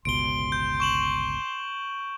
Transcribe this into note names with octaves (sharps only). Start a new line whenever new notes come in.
G1 C#2 B2 C6 D7 G7
G6
C#6 E7 F#7